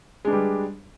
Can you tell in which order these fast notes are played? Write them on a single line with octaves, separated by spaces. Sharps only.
G#3 D4 B4 G3